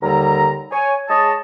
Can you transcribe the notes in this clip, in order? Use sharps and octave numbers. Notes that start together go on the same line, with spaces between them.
D#2 D3 G3 A#5
C#5 G#5
G#3 G#4 C#5 D#5 A5